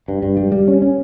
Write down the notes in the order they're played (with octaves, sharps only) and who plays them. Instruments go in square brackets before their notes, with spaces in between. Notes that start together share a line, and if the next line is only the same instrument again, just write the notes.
[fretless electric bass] G2
G2
G3
G3
C#4
C#4